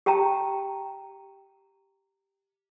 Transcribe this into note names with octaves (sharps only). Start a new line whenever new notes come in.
G4 G5 A5 A#5